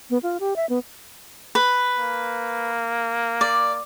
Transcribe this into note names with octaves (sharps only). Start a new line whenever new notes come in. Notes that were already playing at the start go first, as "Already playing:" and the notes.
B3
F4
G4
E5
B3
B4
A#3
D5